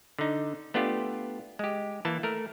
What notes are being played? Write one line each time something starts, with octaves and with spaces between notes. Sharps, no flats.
D3 D#4
A3 B3 D4 F4 G4
G#3 G4
E3 A#3 A5
A3 A#4